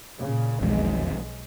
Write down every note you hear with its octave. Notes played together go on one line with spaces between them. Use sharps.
A#2 C#3
E1 B1 F2 D#3 G#3